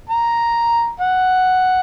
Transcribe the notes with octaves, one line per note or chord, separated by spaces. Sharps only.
A#5
F#5